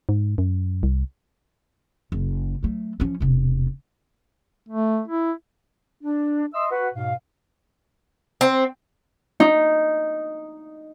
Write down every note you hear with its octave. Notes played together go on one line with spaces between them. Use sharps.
G#2
F#2
C2
F#1
F#3 A3
F3 C#4
E1 C3
A3
E4
D4
D#5 E5 C6 E6
F#4 B4 F#5
G#2 B2 F5
C4
D#4